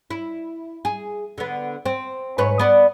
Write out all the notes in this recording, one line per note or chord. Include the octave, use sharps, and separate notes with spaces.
E4
G#4
D3 B3
C4
G#2 B4 C#5
B3 D5